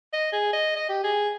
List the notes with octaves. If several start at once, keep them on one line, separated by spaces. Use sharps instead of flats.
D#5
G#4
D#5
D#5
G4
G#4